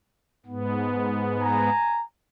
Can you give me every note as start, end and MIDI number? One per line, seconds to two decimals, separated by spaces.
0.46 1.70 44
0.46 1.70 59
1.40 2.03 80
1.40 2.03 82